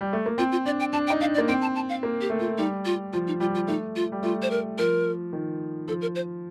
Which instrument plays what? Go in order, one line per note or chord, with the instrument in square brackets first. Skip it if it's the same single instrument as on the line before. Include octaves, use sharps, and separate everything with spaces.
[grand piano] G3
A3
A#3
[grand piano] C4 [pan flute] F4
[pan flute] F4
[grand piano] D4 [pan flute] D5
[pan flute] G5
[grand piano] D4 [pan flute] A5
[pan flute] G5
[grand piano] D#4
[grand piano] D4 [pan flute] F5
[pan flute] D5
[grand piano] A#3
[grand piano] C4 [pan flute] G5
[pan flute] A5
A5
F5
[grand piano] A#3
[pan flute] G4
[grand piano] A3
[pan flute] F4
[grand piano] G3 [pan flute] D#4
[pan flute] F4
[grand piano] F3 [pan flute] F4
[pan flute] D#4
[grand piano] G3 [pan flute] F4
[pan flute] F4
[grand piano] A3 [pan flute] D#4
[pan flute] F4
[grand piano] G3
[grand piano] A3 [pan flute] F4
[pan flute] C5
A#4
[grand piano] F3 [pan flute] A#4
[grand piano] D#3
[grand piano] F3 [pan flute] A4
[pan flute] A#4
C5